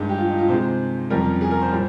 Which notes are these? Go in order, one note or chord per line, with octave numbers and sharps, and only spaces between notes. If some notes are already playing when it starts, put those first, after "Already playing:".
Already playing: G2 D#3 G#3
G4
F4
D#4
F4
C3 D#3 G#3 C5
F2 C#3 G3 A#4
G#4
A#4
C5
A#2 G3